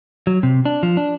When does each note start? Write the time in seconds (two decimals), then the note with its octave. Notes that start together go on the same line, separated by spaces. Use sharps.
0.27 F#3
0.43 C3
0.65 D4
0.83 F3
0.97 D4